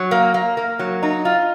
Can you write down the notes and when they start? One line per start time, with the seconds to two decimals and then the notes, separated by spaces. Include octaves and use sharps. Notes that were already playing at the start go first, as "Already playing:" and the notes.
Already playing: F#3
0.11 A#3
0.34 A#3
0.57 A#3
0.79 F#3
1.03 D#4
1.25 F4